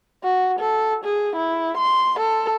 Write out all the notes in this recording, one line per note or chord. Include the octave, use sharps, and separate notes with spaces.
F#4
A4
G#4
E4
C6
A4